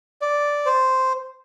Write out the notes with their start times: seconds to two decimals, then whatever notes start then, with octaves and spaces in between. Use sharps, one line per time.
0.22 D5
0.66 C5